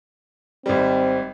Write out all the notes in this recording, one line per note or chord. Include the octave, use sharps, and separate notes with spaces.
G#1 G3 C4